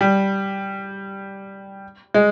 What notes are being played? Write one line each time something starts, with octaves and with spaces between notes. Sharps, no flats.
G3
G#3